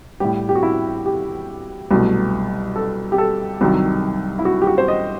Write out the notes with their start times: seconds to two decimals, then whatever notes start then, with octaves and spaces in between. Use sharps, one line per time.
0.20 A2 G3 G4
0.49 G4
0.55 F#4
0.63 E4
1.06 G4
1.91 C2 B2 F#3 A3
2.76 A4
3.12 G4
3.18 A4
3.61 C2 C3 D#3 F#3
4.39 E4
4.45 F#4
4.62 G4
4.67 F#4
4.78 C5
4.88 D#5